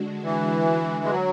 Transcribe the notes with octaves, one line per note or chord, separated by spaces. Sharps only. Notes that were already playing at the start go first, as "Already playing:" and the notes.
Already playing: D3 G#3 D4 F#4
E3
G#3
F#3